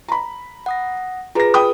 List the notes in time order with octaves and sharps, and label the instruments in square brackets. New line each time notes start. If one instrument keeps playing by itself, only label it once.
[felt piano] A#5 B5
[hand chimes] F#5 D#6 A#6
[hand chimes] F4 G#4 B4 [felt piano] A#5 A#6
[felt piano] G5 B5 D#6